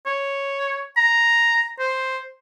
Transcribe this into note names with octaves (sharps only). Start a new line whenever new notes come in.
C#5
A#5
C5